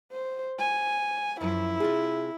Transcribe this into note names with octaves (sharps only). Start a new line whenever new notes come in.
C5
G#5
F#2 F3 E4
C3 F4 G#4